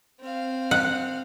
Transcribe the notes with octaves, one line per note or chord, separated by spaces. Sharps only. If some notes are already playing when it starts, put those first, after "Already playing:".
C4 F5
F#5